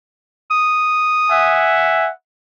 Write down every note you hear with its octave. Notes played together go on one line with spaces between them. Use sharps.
D#6
E5 F#5 G#5